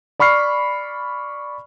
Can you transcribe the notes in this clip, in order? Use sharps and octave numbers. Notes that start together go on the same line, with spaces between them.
D5 B5 C#6 F6 C7